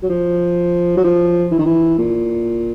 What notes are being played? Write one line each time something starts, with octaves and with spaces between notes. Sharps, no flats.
F#3
F3
F#3
F3
E3
D#3
E3
A#2